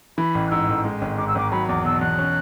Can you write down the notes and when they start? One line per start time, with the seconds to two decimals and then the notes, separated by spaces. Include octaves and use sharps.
0.18 E3 B5
0.35 A1
0.47 F#6
0.51 G#2 E6
0.68 A1
0.85 G#3
1.01 G#1
1.18 G#2 D6
1.28 E6
1.35 G#1 D6
1.52 F#3 B5
1.68 E2 D6
1.85 B2 E6
2.01 E2 F#6
2.18 C#4